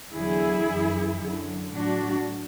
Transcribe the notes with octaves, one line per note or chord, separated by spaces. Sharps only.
E2 D3 F#3 E4 G#4
F#2 E3
F#2 D3 F#3
A2 F#3 D4 F#4